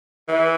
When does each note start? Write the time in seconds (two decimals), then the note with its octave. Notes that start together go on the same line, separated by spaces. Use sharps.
0.28 E3